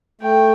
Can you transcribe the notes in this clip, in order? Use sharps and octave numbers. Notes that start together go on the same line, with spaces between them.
A3 G5